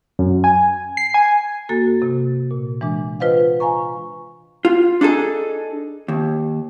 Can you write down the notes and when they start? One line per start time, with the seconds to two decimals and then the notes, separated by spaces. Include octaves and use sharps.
0.19 F#2
0.44 G#5
0.97 C7
1.14 G#5
1.69 G2 A#3 F#4 A4 A6
2.02 C3
2.51 A#2
2.81 E3 G#3 D4
3.20 F4 B4 C5 D#5 F5 F#5
3.60 F5 G#5 A#5 C#6
4.65 F4
5.01 D4 D#4 G#4 A4
6.08 D#2